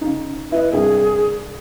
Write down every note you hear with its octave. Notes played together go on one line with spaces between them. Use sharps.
C#3 D#4
E4 B4 D#5
C2 G2 G#4